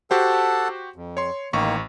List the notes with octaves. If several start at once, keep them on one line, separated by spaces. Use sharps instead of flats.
F#4 G4 A4 C5 F#5 A5
F2
C#5 C6
A1 D#3 A#3 C#6